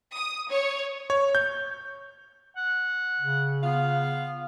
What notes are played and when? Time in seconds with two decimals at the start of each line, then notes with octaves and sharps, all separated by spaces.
0.15 D#6
0.50 C#5
1.10 C#5
1.35 G6
2.56 F#5
3.20 C#3
3.63 B3 F4 F5